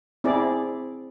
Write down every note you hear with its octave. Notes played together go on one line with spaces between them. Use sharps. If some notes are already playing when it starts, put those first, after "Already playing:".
C4 E4 G#4 D5